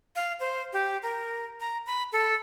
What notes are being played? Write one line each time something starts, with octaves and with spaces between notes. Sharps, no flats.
F5
C5
G4
A#4
A#5
B5
A4